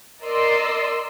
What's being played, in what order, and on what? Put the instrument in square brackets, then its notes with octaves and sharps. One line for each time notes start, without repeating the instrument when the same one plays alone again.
[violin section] A#4 D5 D#5 C6 E6